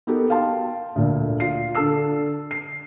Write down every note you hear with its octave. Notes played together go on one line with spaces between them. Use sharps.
B3 D#4 F#4 G4 A4 A#4
F5 G5 A5 C6
D2 A#2 D3
F4 C7
D3 D4 A4 A5 E6 C7
C7